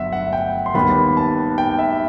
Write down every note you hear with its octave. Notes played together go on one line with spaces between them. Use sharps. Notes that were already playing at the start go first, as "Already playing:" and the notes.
Already playing: G1 G2 F#3 B3 E5 F#5
F#5
G5
C6
D#2 D#3 G3 B3 B5
A5
G5
E5